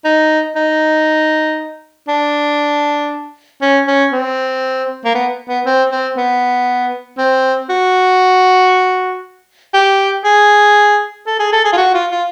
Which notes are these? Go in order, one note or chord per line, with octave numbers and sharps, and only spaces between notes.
D#4
D#4
D4
C#4
C#4
C4
A#3
B3
B3
C4
C4
B3
C4
F#4
G4
G#4
A4
G#4
A4
G#4
F4
F#4
F4
F4